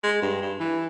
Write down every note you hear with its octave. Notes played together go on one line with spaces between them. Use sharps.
G#3
G2
G2
E3